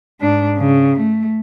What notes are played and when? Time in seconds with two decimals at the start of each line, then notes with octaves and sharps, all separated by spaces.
0.21 G#2 D4
0.58 C#3
1.00 A3